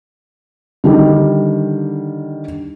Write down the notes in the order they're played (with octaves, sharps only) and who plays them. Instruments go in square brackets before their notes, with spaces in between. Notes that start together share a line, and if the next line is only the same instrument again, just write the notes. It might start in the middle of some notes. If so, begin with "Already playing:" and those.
[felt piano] D3 D#3 G3